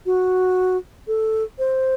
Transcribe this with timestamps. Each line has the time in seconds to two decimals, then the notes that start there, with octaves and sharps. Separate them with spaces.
0.06 F#4
1.08 A4
1.59 C5